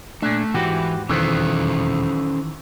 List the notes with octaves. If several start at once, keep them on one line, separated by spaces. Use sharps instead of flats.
A#2 A3 D4
G#2 E3 F#4 G4
E1 F2 D#3 E3 C#4 A4 C5